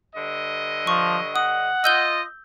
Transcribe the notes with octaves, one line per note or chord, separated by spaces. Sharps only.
G2 D3 D#5
F3 C#6
F#5 D#6
F4 D#5 E6 G6 G7